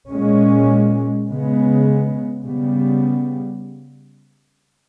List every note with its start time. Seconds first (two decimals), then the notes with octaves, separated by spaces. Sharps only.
0.10 A#2 G#3 C#4
1.26 C#3 G#3 B3
2.43 C#3 G3 B3